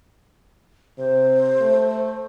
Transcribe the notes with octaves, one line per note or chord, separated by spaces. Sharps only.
C3 C5
A3